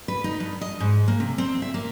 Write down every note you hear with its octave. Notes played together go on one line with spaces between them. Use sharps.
B4
D#4
G2
D#5
G#2
A#3
C3
C4
E5
A#3